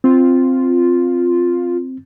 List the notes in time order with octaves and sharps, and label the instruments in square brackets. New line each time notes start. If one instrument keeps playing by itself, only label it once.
[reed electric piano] C4 [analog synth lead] F4